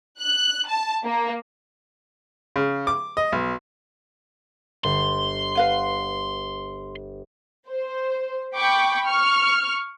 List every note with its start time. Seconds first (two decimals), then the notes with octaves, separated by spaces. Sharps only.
0.20 F#6
0.67 A5
1.03 A#3
2.56 C#3
2.87 D6
3.17 D#5
3.32 B1
4.84 G1 C6
5.55 B4 F5 F#5 D#7
7.68 C5
8.55 G5 B5 C#6 D6
9.05 C#6 F6